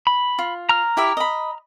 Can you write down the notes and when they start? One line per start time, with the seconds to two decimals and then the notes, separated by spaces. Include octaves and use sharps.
0.07 B5
0.39 F4
0.69 A#5 F6
0.97 E4 G4 E5
1.17 D#5 B5